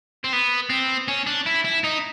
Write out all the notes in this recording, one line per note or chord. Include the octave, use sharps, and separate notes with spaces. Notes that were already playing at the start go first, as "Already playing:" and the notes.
C4
B3
C4
C#4
D4
E4
E4
D#4